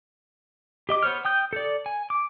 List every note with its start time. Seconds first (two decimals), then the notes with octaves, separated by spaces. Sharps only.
0.89 G4 D#5 D6
1.03 B3 C5 C#5 F6
1.25 G5 D#6 G6
1.53 A4 D5
1.86 G#5
2.10 D6